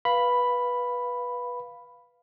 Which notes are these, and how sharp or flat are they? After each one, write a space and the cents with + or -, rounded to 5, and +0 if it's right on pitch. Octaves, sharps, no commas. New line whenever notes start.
B4 -15 F5 +0 B5 +0